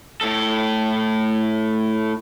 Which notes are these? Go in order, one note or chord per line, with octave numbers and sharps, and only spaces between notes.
A2 A4